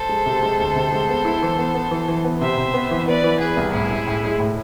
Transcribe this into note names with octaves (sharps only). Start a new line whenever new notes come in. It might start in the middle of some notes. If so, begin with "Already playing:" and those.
Already playing: A4 C5
G#3
C3
G#3
D2
C3
G#3
B3
E4
E3
B3
B3
E3
E3
B3
C3 C5 E5
C3
B3
E3
B3 B4 D5
E3
B3 G#4 B4
C2
A2 E4 G#4
G#3
A2
G#3
A2